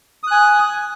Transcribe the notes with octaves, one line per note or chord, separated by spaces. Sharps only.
G#5 D#6 F#6